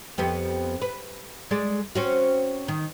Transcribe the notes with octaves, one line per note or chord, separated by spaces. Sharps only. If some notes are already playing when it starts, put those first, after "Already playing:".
F2 B3 G4
B4
G#3 G#4 D5
C4 C#4 F#4
D#3